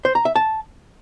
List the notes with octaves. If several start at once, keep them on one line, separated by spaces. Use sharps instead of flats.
C5
A#5
E5
A5